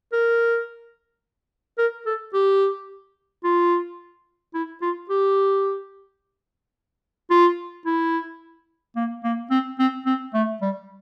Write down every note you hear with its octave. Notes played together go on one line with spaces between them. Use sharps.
A#4
A#4
A4
G4
F4
E4
F4
G4
F4
E4
A#3
A#3
C4
C4
C4
A3
G3